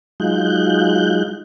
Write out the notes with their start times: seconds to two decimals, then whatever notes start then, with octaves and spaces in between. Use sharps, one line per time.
0.20 F#3 G#3 D#4 F4 F#6 G6